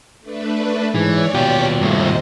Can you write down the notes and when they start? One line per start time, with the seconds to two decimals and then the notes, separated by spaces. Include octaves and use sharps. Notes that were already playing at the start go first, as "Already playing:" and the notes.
0.20 A3 D4 B4
0.95 G#2 E3 C#5 D5
1.35 D#2 B2 F4 G4
1.81 G2 C3 A3 C5 D#5